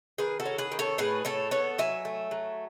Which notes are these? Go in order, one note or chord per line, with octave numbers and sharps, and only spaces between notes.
D#3 G#4 B4
F#4 A4
C#4
G#4 B4
D#3
A4 C#5
A2 G#4 B4
A2 A4 C#5
B3 A4 C#5
F#3 E5 G#5
A3
F#3